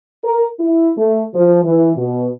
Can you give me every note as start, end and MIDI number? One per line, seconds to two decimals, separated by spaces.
0.24 0.46 70
0.60 0.92 64
0.97 1.23 57
1.34 1.61 53
1.64 1.94 52
1.96 2.28 47